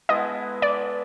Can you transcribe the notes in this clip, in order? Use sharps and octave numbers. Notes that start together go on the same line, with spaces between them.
G#3 B3 E4 A4 D#5
D5